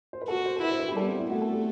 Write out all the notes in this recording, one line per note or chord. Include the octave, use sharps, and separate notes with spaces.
C5
B4
F#4 A4
C5
A4
E4 B4
C5
B4
G4
G3 A4
B3
C4
E4
A3 F#4
A4
G4